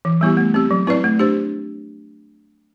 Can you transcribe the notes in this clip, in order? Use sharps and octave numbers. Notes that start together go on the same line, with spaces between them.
E3
G3 B3 E4 G4
A3
C4 G4
F#3
C4 E4 B4 D5
A3
D4 G4 C5